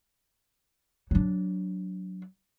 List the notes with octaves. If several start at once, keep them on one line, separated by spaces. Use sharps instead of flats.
F#3 D4